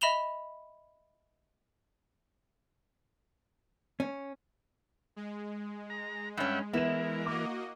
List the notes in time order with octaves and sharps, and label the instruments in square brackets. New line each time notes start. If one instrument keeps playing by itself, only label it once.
[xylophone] D#5 E5 B5 E7 F7 G7
[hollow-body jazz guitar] C#4
[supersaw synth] G#3
[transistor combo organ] A#5
[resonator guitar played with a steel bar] G2 C#4 [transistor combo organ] E5 F#5 G5
[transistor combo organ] E3 A#4 [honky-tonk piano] B3 E7 [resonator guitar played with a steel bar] E4
[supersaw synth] A#3 F#4 D#5 [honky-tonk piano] D6